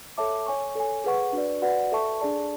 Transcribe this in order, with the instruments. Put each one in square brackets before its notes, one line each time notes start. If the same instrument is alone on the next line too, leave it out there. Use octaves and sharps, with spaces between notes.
[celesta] A4 C#5 E5 A5 D6
C#5 G#5 C#6
A4 C#5 G#5
G#4 B4 F#5 C#6
D4 F#4 B4 D5
F#4 B4 D5 F#5
A4 E5 A5 C#6
D4 G#4 D5 A5